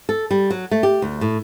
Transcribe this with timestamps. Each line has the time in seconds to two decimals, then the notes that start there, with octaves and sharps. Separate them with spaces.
0.09 A4
0.31 G3
0.50 F#3
0.71 A3
0.83 G4
1.02 D2
1.21 A2